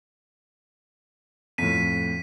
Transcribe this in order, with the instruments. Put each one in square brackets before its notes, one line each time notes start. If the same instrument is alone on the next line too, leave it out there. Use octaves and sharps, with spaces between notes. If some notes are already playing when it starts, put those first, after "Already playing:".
[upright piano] F2 A2 [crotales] B6 D#7